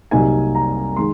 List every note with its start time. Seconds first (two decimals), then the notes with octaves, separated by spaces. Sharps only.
0.11 C2 C3 F#3 A#3 D#4 G#5
0.55 A#5
0.96 D#3 G#3 C6